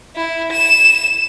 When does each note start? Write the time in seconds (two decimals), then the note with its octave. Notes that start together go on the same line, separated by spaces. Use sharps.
0.15 E4
0.52 E7